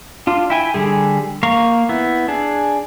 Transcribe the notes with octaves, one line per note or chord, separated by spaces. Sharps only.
D4 F4
E4 G5 G#5
D3 G3 G#4
A#3 F5 A#5 C#6
B3 E4
D4 G#4